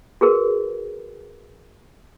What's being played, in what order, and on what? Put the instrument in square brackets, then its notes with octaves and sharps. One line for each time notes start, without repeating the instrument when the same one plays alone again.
[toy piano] F#4 G#4 A#4 B4